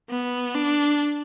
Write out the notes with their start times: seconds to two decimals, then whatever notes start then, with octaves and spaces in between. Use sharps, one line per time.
0.10 B3
0.55 D4